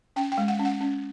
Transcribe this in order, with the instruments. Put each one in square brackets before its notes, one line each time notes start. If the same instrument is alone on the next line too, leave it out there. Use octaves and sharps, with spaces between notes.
[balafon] C#4 G5
G5
G#3
F#5
C#4
F#5
C#4